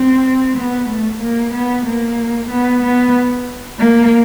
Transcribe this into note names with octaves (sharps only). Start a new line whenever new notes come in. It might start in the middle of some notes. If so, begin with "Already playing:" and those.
Already playing: C4
B3
A3
A#3
B3
A#3
B3
B3
A#3